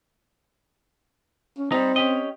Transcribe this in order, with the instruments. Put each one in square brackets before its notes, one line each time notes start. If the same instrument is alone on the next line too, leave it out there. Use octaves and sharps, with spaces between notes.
[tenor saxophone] C#4
[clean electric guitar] G3 D#4 [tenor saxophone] C4
[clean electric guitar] C#4 G4 D#5